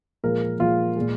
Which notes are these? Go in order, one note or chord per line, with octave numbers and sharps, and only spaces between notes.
A#2 F3 G#3 A#4
A#2 F3 G#3 F4
A#2 G#3